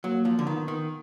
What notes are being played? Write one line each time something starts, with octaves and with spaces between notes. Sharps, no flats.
F#3 A#3
F3
D3
D#3 B3
D#3